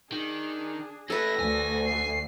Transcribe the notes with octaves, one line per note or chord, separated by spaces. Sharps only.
D#3 D4 G#4
C#4 E4 A4 B4 A#6
D2 G#5
C7